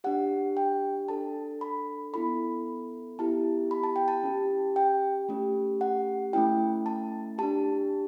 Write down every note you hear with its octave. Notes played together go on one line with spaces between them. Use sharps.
D4 G4 F#5
G5
D4 A4 A5
B5
B3 E4 A4 B5
B3 E4 G4 A5
B5
A5
G5
A5
C#4 G4
G5
A3 C#4 G4
F#5
A3 C#4 E4 G5
A5
D4 G4 A5